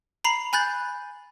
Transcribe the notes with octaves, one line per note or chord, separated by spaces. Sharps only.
A#5 B5 C7 F7 F#7
G#5 B5 F#6 G6 A6